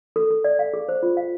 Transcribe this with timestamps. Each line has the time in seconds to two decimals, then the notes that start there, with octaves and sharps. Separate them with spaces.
0.16 A4
0.31 A4
0.44 D5
0.59 F5
0.74 G#4
0.89 C5
1.03 F4
1.17 F5